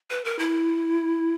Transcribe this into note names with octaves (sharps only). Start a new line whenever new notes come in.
B4
A#4
E4